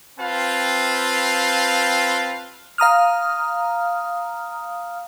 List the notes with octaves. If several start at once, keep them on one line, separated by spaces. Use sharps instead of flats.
C4 F4 B4 F5 G5 A5
F5 A#5 D#6 F6